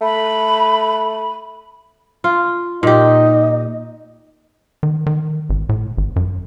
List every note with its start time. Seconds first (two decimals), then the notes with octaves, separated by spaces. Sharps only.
0.01 A3 B5
2.24 F4
2.83 A#2 D#4 G4 D#5
4.83 D#3
5.06 D#3
5.50 G#1
5.69 A2
5.97 G#1
6.16 F#2